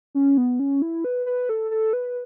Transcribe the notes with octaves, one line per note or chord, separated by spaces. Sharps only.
C#4
B3
C#4
E4
B4
B4
A4
A4
B4